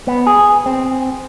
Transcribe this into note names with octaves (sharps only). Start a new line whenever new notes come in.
B3
G#4
C4